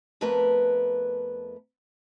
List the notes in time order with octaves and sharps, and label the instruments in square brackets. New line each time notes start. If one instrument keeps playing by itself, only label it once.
[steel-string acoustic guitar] F2 A3 B3 A#4 B4